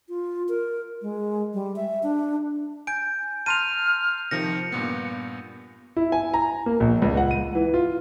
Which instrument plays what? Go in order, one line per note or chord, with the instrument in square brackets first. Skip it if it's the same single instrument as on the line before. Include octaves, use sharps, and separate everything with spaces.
[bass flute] F4
A#4
G#3
G3
E5
D4
[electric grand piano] G#5 [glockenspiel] G6 D7
[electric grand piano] A5 A#5 C6 [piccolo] F6 [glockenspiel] D#7 F7
[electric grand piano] C3 D#3 F3 [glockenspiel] A#6 [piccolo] C#7
[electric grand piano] G2 A#2 B3
[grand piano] E4
G#5
A#5
A#3
A#1
C#2
F#5
D#7
E3
F4